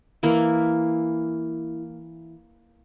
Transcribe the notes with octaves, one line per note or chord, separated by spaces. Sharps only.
E3 A#3 E4